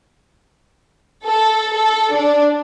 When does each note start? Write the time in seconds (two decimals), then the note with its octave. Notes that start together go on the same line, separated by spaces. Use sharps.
1.26 A4
1.77 A4
2.15 D4